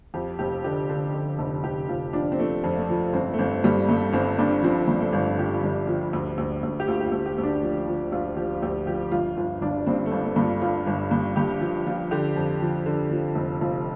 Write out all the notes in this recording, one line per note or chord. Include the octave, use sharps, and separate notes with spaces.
F2 G4
F1 G4
D3 G4
D3
D3
F1
F1 G4
F1 F4
F3 D4
C4
F3 A3
F2
A3
F3
G1 C4
A3
G1 C4
G2 G3
G2 A3
G1 C4
G2 D4
F3 C4
G2
A3
G1
F3 G4
G1
F3
D2
D2
D2
G4
D2 F4
G4
F4
D2
G4
D2
D4
F3
F3
D2 F4
F3 G4
F4
D2 G4
F3 G4
G1 F4
G1 F4
G1 D4
G2 C4
A3
G1
A3
G2
F4
G1 F4
G1
G2
G2 G4
F3 F4
F3 F4
D3 G4
F2
F3
D3
F3
F1
F1 F4